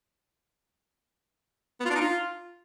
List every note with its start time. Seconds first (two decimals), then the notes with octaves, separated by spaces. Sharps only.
1.80 B3
1.85 F4
1.90 D4
1.95 D#4
2.01 F4